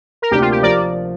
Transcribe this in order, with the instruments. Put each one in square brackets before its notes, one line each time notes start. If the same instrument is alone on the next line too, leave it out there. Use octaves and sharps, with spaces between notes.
[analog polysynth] A#4
[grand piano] D2 C3 A#3 D4 [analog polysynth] G4
[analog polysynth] F4
G4
[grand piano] F3 [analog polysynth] A#4 D5